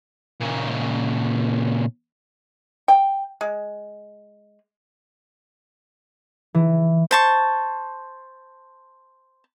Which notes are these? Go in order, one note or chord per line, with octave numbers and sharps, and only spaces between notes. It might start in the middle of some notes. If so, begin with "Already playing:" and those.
A#2 C#3
G5
G#3
E3
C5 A5 C#6